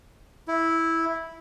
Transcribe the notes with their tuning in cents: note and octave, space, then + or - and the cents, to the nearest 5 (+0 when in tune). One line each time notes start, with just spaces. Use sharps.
E4 -5